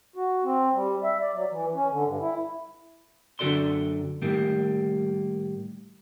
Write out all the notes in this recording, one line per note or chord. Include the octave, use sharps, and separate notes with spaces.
F#4
C4
G3
E5
D5
F#3
E3
C#4
D3
G2
E4
F#2 D3 F#4 A4 D5 C6
A2 D#3 G3 A#3